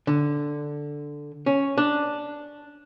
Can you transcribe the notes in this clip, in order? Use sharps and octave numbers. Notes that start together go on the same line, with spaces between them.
D3
C#4
D4